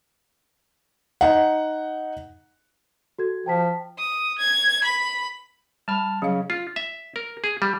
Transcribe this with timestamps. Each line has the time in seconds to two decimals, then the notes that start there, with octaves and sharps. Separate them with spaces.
1.21 D#4 F#5
3.19 F#4 A4 G#6
3.46 F3 G5 A5 B6
3.99 D#6
4.38 G#6
4.84 B5
5.88 G3 A5 B5 F6
6.22 C#3 F#3 F5
6.50 F4
6.76 E5
7.16 A#4
7.44 G#4
7.62 G3